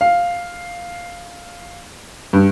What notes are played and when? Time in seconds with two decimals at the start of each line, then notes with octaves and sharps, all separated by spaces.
0.01 F5
2.33 G2